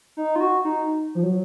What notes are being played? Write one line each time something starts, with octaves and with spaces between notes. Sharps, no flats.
D#4
F4
F#4
D#4
F3
F#3